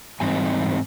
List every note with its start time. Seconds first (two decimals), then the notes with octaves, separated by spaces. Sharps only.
0.20 G#2 E3 G3 C4 D#4 G#5